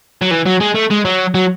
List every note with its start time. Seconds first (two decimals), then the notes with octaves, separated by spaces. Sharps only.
0.22 F#3
0.31 E3
0.46 F#3
0.60 G#3
0.75 A3
0.90 G#3
1.05 F#3
1.35 F#3